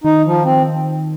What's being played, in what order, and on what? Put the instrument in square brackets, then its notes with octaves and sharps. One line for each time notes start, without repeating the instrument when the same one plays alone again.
[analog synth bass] D#3 [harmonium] D#4
[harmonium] F3
C4